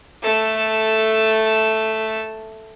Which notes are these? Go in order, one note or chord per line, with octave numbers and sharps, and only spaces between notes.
A3 A4